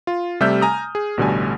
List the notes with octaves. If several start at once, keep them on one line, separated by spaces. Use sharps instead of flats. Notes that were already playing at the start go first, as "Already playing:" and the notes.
F4
C3 G3 A3 E5 F6 G6
G#5 A#5 D#6
G#4
A1 B2 D3 G3 A3 G#5